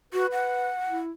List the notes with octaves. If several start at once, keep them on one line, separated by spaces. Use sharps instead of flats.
F#4 B4
F#5
E4